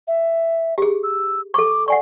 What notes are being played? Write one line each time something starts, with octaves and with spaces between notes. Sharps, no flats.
E5
G4 G#4
E6
A4 C#6 D6
D5 F#5 G#5 C#6